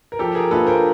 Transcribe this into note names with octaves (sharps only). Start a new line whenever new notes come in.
A#4
F3 G4 A4
G#4 A#4
A#3 D4 F4 A4 B4
A#4 C5